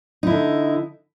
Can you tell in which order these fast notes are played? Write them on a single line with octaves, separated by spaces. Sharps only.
D#4 E4 D3